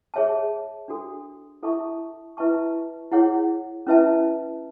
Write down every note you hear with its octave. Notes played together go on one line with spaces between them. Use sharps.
G#4 C#5 E5 A5
D4 F#4 A4
E4 A4 E5 A5 C#6
E4 B4 E5 A5 C#6
E4 G#4 C#5 F#5
C#4 E4 B4 E5 A5